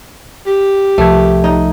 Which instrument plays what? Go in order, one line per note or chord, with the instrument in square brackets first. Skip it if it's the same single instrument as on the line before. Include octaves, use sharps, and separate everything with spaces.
[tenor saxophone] G4
[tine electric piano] C2 F3 G#6 [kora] A3
[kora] D#4